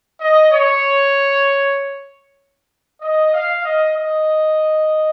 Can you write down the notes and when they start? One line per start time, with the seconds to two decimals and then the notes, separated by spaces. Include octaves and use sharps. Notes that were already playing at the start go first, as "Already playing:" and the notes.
0.19 D#5
0.51 C#5
3.02 D#5
3.33 F5
3.64 D#5
3.95 D#5